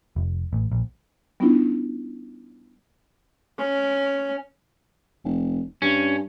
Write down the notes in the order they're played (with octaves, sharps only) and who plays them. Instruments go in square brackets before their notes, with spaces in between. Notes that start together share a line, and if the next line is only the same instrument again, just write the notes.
[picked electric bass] F1
A1
A#1
[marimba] G3 B3 C#4 D4 E4 F4
[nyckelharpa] C#4
[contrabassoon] F1
[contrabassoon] G2 [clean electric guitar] C#4